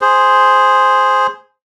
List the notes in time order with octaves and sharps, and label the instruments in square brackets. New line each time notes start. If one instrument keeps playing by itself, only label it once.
[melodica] G#4 C5